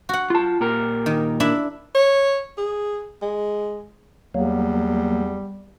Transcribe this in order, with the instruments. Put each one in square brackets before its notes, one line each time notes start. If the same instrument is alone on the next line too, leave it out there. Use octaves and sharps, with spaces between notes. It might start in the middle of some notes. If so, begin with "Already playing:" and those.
[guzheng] F#4 F#5
[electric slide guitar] F4 A5
A#2 G4 A#4
[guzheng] D#3
D4 E4 E5
[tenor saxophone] C#5
G#4
G#3
[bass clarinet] E2 [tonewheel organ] F#3 A#3 [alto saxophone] G3